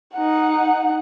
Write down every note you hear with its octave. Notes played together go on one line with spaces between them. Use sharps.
D#4 F#5